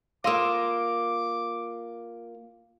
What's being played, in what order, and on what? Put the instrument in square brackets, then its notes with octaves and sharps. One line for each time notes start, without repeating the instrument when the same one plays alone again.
[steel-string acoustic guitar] A#3 F4 [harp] D#5 C6 E6 [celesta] F5 [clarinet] D6